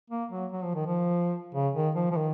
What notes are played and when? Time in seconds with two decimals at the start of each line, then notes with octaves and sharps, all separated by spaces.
0.10 A#3
0.31 F#3
0.52 F#3
0.64 F3
0.75 D#3
0.86 F3
1.55 C#3
1.75 D#3
1.95 F3
2.11 F3
2.16 D#3